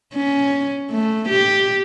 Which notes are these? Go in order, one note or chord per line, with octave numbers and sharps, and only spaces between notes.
C#4
A3
G4